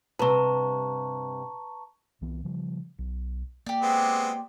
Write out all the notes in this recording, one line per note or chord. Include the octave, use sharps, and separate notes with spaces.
G2 C3 B4 A5 A#5 C#6
C2 E3 B3
C#3 F3 G3
B1
A#3 G4 D5
G#3 B3 C4